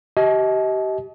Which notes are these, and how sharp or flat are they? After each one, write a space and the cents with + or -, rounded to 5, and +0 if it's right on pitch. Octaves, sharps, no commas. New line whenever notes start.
G4 -30 D#5 +35 A5 -40